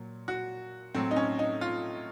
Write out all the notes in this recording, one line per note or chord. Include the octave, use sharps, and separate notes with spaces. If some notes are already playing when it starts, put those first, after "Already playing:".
Already playing: A#2 F#3
F#4
A2 F#3 C4
D#4
C#4
D#4
F4